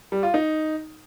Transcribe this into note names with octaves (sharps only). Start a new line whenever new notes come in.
G3
F4
D#4